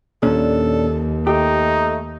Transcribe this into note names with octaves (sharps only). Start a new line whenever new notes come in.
D#2 A#2 C#4 D4 A4
A3 D#4 G4